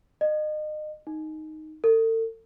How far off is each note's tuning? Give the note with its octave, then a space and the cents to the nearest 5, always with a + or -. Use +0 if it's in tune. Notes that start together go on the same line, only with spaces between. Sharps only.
D#5 -30
D#4 +0
A4 +40